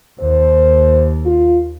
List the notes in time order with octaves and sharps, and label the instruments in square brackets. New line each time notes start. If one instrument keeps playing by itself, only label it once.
[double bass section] D#2 [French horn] C5
[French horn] F4